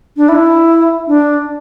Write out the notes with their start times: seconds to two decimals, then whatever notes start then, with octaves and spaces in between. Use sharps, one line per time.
0.17 D4
0.29 E4
1.08 D4